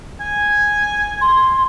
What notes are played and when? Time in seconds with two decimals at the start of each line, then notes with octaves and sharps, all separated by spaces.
0.20 G#5
1.21 C6